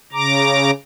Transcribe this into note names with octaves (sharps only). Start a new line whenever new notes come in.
C#3 A#5 D6